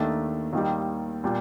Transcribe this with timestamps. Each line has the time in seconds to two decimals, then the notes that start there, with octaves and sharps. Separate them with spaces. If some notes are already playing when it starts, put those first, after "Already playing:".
Already playing: D#2 D#3 A3 D4
0.53 D#2 D#3 G3
1.24 A#2 G3